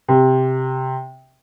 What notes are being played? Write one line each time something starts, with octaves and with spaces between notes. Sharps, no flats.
C3